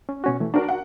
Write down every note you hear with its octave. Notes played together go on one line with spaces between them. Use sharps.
C#4
B2 C#4 F#4
E3 A3
D4 F#4 A#4
F#5